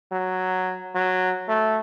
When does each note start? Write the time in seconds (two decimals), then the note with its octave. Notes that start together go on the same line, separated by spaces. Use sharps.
0.12 F#3
0.95 F#3
1.48 A3